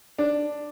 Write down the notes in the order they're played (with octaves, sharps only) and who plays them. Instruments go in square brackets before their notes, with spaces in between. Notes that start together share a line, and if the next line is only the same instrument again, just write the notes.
[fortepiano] D4